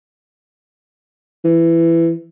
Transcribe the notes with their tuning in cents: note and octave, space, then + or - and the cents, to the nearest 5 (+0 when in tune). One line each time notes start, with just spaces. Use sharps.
E3 +15